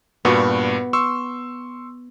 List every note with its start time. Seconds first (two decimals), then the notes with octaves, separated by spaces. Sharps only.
0.25 G2 A#2 B3 F#4
0.93 C6 C#6 E6